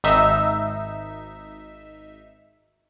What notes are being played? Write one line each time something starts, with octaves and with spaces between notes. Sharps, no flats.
G#1 D#4 E5